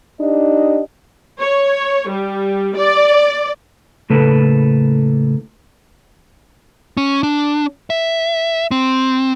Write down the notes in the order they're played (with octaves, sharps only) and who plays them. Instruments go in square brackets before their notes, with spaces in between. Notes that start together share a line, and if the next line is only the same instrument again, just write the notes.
[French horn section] D4 D#4 G4 D#5
[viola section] C#5
G3
D5
[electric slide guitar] A2 C#3 A#3 A4 B4
[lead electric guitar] C#4
D4
E5
C4